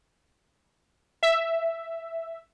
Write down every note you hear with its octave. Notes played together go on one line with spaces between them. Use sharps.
E5